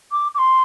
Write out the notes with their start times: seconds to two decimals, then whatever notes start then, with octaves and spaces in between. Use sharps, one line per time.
0.12 D6
0.35 D6
0.38 C6